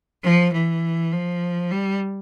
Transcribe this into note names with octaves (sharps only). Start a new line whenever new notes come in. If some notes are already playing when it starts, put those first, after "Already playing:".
F3
E3
F3
G3